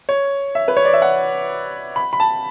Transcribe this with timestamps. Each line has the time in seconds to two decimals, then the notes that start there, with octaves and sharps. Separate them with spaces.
0.09 C#5
0.55 E5
0.68 B4
0.77 C#5
0.85 D5
0.94 E5
1.02 F#5
1.96 B5
2.13 B5
2.20 A5